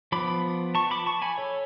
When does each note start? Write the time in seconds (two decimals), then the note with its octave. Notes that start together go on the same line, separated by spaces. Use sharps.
0.12 F3 B3 B5 D6
0.75 A5 C#6
0.91 B5 D6
1.06 A5 C#6
1.22 G#5 B5
1.38 A4 C#5